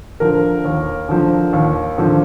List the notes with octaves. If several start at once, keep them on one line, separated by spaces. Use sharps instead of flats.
D3 F3 A#4
D#2
D3 F3
D#2
D3 F3